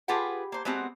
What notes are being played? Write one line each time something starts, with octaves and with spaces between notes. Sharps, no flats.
F4 G4 G#4 B4 F#5 G5
A#3 C5
G#3 B3 C4 F#4 G4